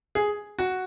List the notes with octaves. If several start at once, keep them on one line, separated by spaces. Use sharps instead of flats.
G#4
F#4